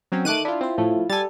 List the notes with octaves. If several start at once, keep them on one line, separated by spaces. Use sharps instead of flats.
F#3 C4 C#4
D#3 A3 D6 F#6 D#7
D4 E4 F4
C4 C5
A2 F3 A3
G3 A4 G#5 A6